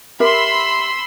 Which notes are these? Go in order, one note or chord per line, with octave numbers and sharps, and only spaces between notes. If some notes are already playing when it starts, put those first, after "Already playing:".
G4 A#4 E5 B5 C6 E6